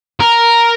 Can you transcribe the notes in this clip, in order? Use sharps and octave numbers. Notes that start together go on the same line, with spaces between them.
A#4